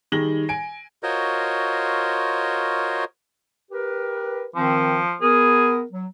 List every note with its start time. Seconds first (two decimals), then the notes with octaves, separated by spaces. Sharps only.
0.12 D#3 G3 G#4 A#6 F#7 G7
0.49 G#5 D7
1.03 F4 F#4 A#4 C5 C#5 D#5
3.71 G4 A#4 B4
4.56 D#3 F3 C4
5.22 B3 G#4 A#4
5.92 F#3